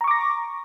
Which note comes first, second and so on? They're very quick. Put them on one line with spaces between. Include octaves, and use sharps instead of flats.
A#5 C#6 D6 A#6